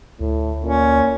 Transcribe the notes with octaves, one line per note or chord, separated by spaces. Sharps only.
D2 A2
A#2 C#4